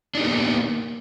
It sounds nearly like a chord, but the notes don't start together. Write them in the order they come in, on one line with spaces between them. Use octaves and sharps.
D4 D#4 G4 B3 A#3